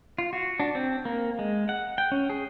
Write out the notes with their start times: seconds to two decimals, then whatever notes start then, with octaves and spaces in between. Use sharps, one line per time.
0.18 F4
0.33 F#4
0.60 D4
0.75 C4
1.05 A#3
1.39 G#3
1.69 F#5
1.98 G5
2.12 C#4
2.30 G#4